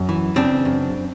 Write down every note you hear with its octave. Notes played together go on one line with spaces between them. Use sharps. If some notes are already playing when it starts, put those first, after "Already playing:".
Already playing: F#2
E3
C#3 C4 D4
F#2